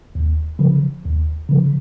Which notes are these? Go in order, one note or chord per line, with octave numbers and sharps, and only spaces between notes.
D#2
C#3 F3
D#2
C#3 F3